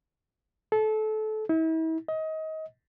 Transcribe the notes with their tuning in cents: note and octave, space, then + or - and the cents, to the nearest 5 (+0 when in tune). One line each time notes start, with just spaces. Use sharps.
A4 -25
E4 -40
D#5 +25